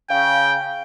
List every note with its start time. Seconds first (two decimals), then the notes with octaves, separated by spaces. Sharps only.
0.10 C#3 F5 G5